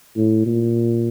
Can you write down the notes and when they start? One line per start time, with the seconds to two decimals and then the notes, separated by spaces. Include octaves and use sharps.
0.16 A2
0.46 A#2